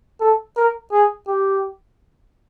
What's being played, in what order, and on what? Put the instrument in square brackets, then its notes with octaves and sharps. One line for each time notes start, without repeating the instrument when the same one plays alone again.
[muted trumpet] A4
A#4
G#4
G4